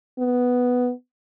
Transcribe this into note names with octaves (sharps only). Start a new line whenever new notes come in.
B3